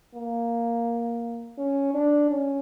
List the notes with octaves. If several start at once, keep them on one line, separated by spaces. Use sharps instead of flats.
A#3
C#4
D4
C#4